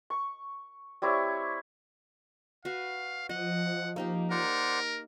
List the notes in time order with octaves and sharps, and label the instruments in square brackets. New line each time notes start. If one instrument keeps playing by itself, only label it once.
[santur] C#6
G3 C4 E4 C#5
[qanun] F#4 B4 [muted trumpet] F5
[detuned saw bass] F3 [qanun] D#5 [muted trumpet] F#5
[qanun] A#3 D#4 G4
[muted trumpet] A#4 [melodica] C5 D5 F#5